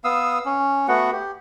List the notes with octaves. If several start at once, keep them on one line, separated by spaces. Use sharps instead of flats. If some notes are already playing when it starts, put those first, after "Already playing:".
B3 F5 D#6 E6
C#4
A3 B3 F#4 F#5
G4